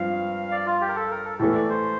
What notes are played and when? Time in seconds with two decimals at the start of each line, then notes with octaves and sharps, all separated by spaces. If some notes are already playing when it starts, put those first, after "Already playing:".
Already playing: G2 F3 C4 F5
0.51 D5
0.66 F4
0.81 G4
0.89 A#4
0.95 A4
1.11 A#4
1.25 A4
1.39 A2 E3 A3 A4
1.54 D5
1.69 C5